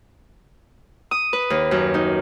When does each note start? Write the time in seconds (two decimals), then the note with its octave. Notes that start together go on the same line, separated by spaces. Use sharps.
1.11 D#6
1.33 B4
1.50 D#2
1.71 F#2
1.94 D#4